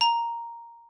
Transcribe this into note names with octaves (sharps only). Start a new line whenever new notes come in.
A#5